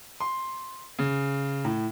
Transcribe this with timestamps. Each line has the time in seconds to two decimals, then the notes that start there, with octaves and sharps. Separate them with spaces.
0.20 C6
0.99 C#3
1.65 A2